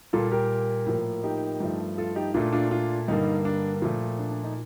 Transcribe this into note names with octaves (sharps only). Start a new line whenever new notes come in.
A#2 G3 A#3 F4 A4
G4 A#4
A2 F3 A#3
D#4 G4
G2 F3 A3
F4 A4
D#4 G4
A#2 A3 D4 F4
D4 F4
D4 F4
G2 D3 G3 A#3 D#4
D4
A#2 F3 A3
D4
D4
D#4